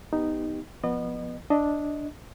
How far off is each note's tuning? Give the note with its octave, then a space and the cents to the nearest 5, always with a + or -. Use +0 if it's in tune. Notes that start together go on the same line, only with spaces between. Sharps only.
B3 +0 D#4 -5 G4 +0
F3 +0 B3 -10 D#5 -35
D4 +0 D#5 +10